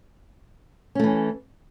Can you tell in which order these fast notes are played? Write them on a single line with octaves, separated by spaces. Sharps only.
C#4 A3 E3